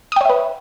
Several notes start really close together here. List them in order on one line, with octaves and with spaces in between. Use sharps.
D#6 G5 C#5 E5 B4